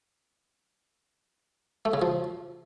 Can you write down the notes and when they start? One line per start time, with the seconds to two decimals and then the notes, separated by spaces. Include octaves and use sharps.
1.85 A3
1.94 C#3
2.02 F3